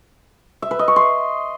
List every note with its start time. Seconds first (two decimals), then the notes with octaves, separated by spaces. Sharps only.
0.62 E5
0.71 B4
0.79 D#5
0.88 C#6
0.96 C6